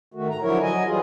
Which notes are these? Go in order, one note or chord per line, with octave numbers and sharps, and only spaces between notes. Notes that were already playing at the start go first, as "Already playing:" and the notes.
D#3 A3 F#4
G#2 A#5
D3 F3 F#3 E4 A#4 C#5
F#3 D#5 G#5
E3 F#3 G3 F4 G#4